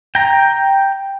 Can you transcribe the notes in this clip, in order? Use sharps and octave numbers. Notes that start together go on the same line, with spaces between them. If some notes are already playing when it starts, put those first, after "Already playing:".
G5 A#5